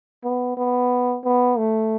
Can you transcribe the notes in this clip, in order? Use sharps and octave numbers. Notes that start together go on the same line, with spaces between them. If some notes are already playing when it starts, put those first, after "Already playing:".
B3
B3
B3
A3